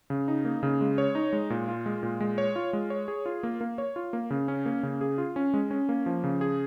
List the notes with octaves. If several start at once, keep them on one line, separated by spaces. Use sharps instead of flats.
C#3
D#4
A#3
C#3
G#3
C#5
D#4
G#3
A#2
F4
G#3
A#2
G#3
C#5
F4
G#3
C#5
G#4
F4
A#3
A#3
C#5
F4
A#3
C#3
C#4
A#3
C#3
G#4
F4
C#4
G#3
C#4
A#3
F3
C#3
G#4